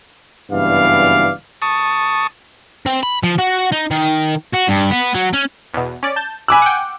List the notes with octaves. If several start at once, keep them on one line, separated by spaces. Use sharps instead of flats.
F#1 G2 E3 B3 D5 F5
A5 C#6 D#6
C4
B5
F3
F#4
D#4
D#3
F#4
G2
B3
F#3
C#4
E2 B2
C#4 D5
A5 G6
G#5 B5 D6 E6 F#6
F#5 G5